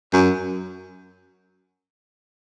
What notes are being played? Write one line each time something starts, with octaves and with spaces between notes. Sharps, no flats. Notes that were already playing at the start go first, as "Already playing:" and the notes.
F#2